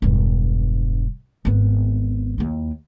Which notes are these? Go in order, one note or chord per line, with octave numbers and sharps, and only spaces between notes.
E1 G2
G#1 B3
D#2 E4